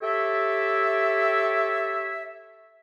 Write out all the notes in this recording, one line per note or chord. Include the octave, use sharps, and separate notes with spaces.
G4 A4 C#5 E5